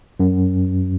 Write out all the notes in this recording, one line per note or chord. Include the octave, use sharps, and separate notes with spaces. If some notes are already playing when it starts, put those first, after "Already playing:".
F#2